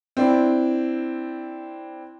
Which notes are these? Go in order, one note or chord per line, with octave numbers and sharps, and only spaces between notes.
C4 D4 E4